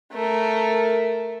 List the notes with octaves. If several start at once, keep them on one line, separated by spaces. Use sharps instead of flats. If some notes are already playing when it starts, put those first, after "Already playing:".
A3 A#4